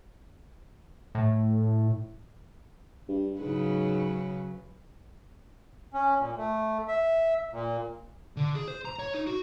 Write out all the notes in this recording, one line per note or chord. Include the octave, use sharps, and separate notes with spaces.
A2
G2
G#2 C#3 F#3 B4
C#4
A#2
A3
E5
A#2
D3
G#4
C5
A#5
C#5
D#4
F#4